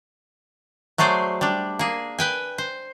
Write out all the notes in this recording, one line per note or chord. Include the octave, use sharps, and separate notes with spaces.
F#3 A3 G#4 C5 D5
G3 D4
A#3 G#4
B4 G5 G#5
C5